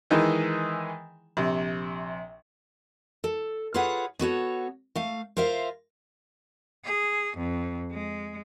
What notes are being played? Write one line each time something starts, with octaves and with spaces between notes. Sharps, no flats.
D#3 E3 G#3 D#4 E4 G#4
A#1 C3
A4
F4 G#4 A4 B4 C#5 F#5
B3 F#4 A4 C#5
A3 F5
F4 A#4 C5 E5 F5
G#4
F2
G#3